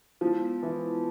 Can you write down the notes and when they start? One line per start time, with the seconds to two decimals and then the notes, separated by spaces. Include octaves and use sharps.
0.21 F3 G#3 B3 E4
0.63 E3